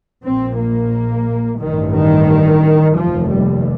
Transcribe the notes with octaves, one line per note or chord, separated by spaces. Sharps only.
A#1 A#2 C4
A#3
A1 G2 D#3
D#3
F1 D#2 F3
G3